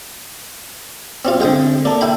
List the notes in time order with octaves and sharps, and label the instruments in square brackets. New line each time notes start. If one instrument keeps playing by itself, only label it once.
[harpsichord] C4 C#4 F4
[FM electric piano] D3 C4 [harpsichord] G#3 G5 D#6
[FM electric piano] A#3 A4 [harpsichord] D5
[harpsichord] E4 G5 B5